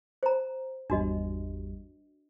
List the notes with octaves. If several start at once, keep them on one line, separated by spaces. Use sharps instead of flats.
C5 A#5
G#1 E2 G3 D4 F#4 D#5